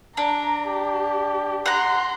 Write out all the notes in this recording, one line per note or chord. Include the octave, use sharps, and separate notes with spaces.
D4 A#5
G4
F#5 A#5 C6